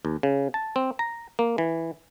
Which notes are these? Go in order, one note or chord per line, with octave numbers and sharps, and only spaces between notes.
D#2
C#3
A5
C4
A#5
A#3
E3